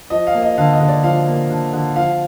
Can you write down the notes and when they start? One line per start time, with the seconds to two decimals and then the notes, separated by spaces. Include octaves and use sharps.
0.10 F3 D#5
0.27 F5
0.34 A#3
0.42 D#5
0.58 D3 F5
0.73 D#5
0.80 D3
0.88 D5
1.03 F3 F5
1.27 A#3
1.50 D3
1.73 D3
1.96 F3 F5